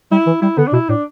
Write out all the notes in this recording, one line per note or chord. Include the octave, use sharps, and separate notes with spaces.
G3 E4
E3
G3 E4
D3 B3
D4
B2 E4
A2 D4